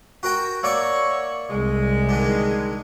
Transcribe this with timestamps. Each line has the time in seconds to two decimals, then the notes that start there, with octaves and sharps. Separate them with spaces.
0.23 F#4 A#4 G5
0.63 A#3 C#5 D5 E5 F#5 C#6
1.50 C2 G#3
2.09 D3 D#3